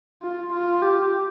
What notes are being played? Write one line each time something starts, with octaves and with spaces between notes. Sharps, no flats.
F4
F4
G4